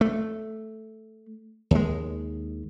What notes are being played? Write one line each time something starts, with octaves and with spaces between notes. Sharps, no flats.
A3
D#2 G#3